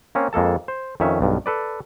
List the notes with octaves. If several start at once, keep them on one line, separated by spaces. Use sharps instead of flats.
A#3 C4 C#4
F2 G#3 A#3 A4 A5
C5
F2 D#3 C#4 E5
B1 G2
A4 B4 D5